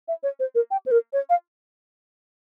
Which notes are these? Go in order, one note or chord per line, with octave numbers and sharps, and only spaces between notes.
E5
C#5
C5
A#4
G5
C5
A#4
C#5
F5